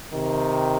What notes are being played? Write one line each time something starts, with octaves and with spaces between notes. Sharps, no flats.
C3 D#3